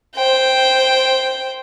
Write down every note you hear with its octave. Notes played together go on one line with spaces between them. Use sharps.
C5 G5